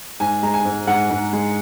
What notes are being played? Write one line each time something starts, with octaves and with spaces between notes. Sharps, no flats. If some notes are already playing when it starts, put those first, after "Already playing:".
G#2 G#5
G#3 A#5
G#5
G#2
G#2 F#5
G#2
G#3